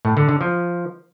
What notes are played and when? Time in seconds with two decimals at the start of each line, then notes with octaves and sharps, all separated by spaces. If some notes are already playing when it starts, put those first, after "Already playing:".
0.05 A2
0.17 D3
0.29 D3
0.41 F3